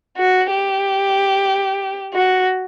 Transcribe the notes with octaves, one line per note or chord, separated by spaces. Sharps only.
F#4
G4
F#4